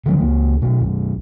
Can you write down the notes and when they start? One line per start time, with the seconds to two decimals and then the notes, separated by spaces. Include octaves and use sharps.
0.06 D3 F3 F#3 B3
0.20 C#2 A#3
0.62 B1 B2 A3
0.81 B1 F#2